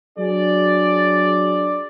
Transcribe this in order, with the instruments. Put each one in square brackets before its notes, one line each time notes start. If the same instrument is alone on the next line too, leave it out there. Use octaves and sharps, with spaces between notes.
[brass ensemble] F#3 D4 G#4 D5